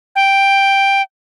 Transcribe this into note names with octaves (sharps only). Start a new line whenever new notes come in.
G5